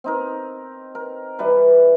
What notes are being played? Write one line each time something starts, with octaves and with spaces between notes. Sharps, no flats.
C4 D#4 A#4
A#4
E3 G3 B4